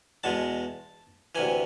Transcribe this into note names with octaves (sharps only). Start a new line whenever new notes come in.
E2 B2 G#3 A5
D2 C3 E3 G#5